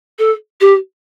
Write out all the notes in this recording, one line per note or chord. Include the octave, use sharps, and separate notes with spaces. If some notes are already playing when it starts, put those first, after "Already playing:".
A4
G4